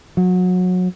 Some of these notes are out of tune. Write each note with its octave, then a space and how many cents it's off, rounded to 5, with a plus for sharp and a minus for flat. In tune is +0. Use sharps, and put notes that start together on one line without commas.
F#3 -25